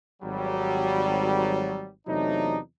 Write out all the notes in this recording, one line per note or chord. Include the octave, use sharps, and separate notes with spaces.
G#1 F#3 G3
E2 C3 F#3 A3 D4 D#4